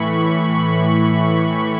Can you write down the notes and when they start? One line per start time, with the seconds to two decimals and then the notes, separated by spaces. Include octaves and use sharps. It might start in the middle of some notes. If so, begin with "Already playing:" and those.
Already playing: A2 E3 B5 C#6
0.20 C#6
0.55 B5